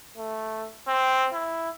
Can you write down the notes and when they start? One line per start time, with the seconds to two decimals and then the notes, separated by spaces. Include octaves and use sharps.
0.17 A3
0.87 C4
1.33 E4